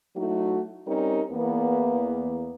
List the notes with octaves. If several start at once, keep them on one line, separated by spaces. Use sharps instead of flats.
F#3 A3 D#4 E4 F#4
G3 C4 C#4 D#4 G4 A#4
E2 A#3 B3